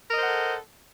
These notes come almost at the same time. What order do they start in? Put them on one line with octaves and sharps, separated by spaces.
A#4 D#5 C5 F#5 A4